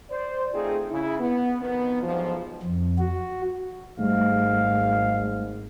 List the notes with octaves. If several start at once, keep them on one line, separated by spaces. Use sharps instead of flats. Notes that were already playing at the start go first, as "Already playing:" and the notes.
C5 D5
A3 C4 D#4 F4 G#4
C#3 E4
B3
F2 B2 D#3 B3
B1 E2 G#2 F3
F2
F#4
G#1 G#2 G3 A3 F5